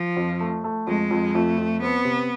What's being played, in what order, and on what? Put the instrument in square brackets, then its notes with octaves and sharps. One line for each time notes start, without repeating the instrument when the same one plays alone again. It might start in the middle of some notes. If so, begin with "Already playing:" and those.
Already playing: [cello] F3
[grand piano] F2
A3
A3
[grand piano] F2 [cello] G#3
[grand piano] F2
[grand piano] F2 [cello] A3
[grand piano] F2
[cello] B3 [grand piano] C4
[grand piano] C3